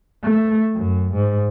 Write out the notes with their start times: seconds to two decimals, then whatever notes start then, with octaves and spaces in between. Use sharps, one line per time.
0.24 A3
0.75 F#2
1.15 G#2